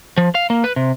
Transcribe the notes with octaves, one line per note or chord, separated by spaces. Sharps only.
F3
F5
A#3
B4
C3